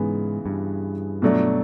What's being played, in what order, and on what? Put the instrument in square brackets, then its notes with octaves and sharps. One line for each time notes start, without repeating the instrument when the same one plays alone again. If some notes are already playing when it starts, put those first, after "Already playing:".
Already playing: [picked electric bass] G#2 [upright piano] C#3 E3 G#3 B3
[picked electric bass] G2
[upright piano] B2 F#3 A3 D4